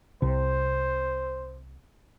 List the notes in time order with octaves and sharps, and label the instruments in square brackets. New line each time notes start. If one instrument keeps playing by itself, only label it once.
[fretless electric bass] C2 C3 [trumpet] C5